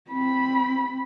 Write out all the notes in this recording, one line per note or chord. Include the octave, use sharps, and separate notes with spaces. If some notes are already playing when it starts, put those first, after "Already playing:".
C4 B5